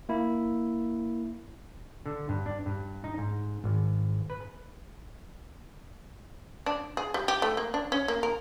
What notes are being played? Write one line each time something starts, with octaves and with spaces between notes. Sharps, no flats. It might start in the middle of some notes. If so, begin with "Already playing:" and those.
A#3 E4
D3
G2
D4
G2
D#4
G#2
G#1
B4
D4
G#4
G3
G4
A3
A#3
D4
C#4
A#3
A#4